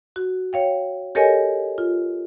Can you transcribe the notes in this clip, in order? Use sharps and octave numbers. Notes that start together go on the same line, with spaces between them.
F#4
C#5 F5 G5
G4 A4 A#4 C#5 D#5 G#5
F4